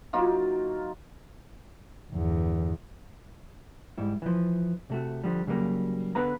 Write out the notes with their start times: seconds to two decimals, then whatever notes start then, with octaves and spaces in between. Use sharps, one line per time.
0.13 F#3 A#3 D#4 F4
2.10 G1 E2
3.98 G#2 G3 E4
4.22 E3 F3
4.90 C3 A3 F#4
5.24 D3 F3 G3
5.47 C#3 F#3 G3 A#3
6.15 D3 B3 G#4 B4 F5 A#5